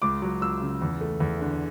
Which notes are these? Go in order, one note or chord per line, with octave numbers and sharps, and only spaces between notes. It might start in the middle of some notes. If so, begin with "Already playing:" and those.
C#2 D6
F#3
C#2 E6
C#3
E2
A3
E2
D3